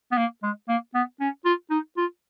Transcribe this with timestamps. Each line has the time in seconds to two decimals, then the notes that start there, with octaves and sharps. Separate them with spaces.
0.12 B3
0.18 A#3
0.43 G#3
0.69 A#3
0.95 B3
1.21 C#4
1.45 F4
1.71 D#4
1.97 F4